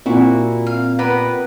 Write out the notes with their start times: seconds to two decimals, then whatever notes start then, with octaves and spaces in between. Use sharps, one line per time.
0.06 A#2 C4 E4 F#4
0.67 F5
0.99 B3 G4 B4 A#5